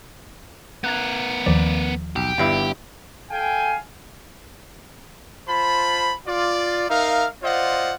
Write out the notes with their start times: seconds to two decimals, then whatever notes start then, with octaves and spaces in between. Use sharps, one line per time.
0.84 B3 A#4 F#6 G#6
1.46 D#2 D#3 F3 D5
2.16 B1 G4
2.38 G1 G2 E4
3.30 A4 F5 G5 G#5
5.48 F4 C5 A5 B5
6.27 F4 D5
6.90 D#4 A#4 E5 F5
7.43 F4 C5 D5 D#5 F5 F#5